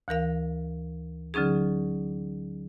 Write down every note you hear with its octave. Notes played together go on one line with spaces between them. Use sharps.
D2 E3 A#4 F5
D3 F#3 C#4 D#4 G#4